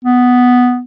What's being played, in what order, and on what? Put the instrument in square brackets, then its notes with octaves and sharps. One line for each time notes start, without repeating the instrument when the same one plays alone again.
[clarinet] B3